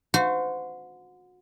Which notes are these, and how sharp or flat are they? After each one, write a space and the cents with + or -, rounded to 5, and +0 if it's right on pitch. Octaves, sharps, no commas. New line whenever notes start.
F#4 -30 C5 -30